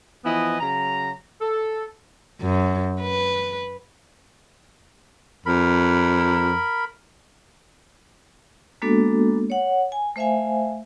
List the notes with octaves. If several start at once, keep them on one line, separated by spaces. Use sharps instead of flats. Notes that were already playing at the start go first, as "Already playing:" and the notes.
E3 F3 B3 E4 D#5
C#3 F#3 A#5
A4
F#2
B4
F2 A#4 B5
G#3 A#3 B3 D4 F#4 A4
C#5 F#5
G#5
A3 C5 E5 F5 G#5